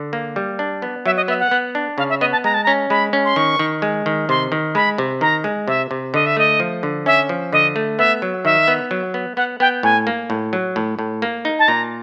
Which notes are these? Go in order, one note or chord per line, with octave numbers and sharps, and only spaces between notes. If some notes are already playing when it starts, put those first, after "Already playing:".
Already playing: D3
A#3
G3
D4
B3
F#3 E5
D#5
B3 E5
F#5
B3
D4
C#3 F5
E5
B3 D#5
A5
G#3 A#5
A5
A#5
C#4
G#3 B5
C#4
C6
D#3 C#6
D#3
G#3
D#3
C3 C6
D#3
G#3 B5
C3
D#3 A#5
G#3
C3 E5
C3
D3 D#5
E5
A3 D#5
F3
D3
C#4 E5
F3
D3 D#5
A3
B3 E5
F#3
D#3 E5
B3
F#3
B3
B3 F#5
B3 G5
A2 G#5
A#3
A2
F#3
A2
A2
A#3
D#4
A5
A#2 A#5